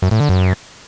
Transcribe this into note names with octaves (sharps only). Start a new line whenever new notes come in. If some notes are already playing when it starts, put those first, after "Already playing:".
F#2
A2
D3
F#2